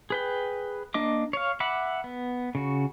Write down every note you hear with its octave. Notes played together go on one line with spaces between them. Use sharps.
G#4 B4 G5
A#3 D4 D#5 D6
C#5 F5
E5 F#5 B5 D6
B3
C#3 F#4